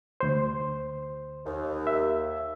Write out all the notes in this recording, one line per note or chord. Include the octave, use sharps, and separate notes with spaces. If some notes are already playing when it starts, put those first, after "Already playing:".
D2 C5
D#2
E5